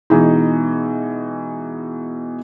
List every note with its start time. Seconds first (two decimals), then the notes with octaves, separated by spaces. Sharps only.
0.10 B2 E3 G#3 D#4